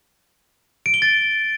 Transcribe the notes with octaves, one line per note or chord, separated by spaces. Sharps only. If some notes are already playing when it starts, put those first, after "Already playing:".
D7
G7
A6